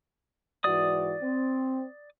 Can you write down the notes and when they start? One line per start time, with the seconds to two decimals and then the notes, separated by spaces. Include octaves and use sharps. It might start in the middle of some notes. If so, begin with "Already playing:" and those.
0.64 G#2 E3 F#4 D5 D#6
1.22 C4